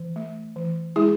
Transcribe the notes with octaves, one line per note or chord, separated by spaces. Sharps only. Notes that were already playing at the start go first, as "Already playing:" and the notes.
Already playing: E3
A3
E3
G#3 E4 G#4